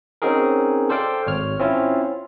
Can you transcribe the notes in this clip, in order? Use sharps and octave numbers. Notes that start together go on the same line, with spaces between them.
C4 C#4 D#4 F#4 G#4 A#4
A4 C5 D5 F5 G5
G#1 C#5 F6
C4 C#4 E4 F4